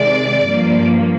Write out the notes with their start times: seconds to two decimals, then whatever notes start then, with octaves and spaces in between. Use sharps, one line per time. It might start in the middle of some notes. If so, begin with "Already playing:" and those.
Already playing: C3 D#3 G#3 D5
0.46 G2 F3 A#3